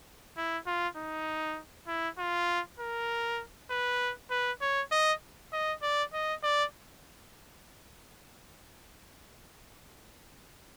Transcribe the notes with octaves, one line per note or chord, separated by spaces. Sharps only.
E4
F4
D#4
E4
F4
A#4
B4
B4
C#5
D#5
D#5
D5
D#5
D5